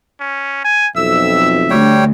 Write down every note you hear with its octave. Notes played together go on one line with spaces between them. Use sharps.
C#4
G#5
B1 F2 E5 E6
D2 G3 C#5 G5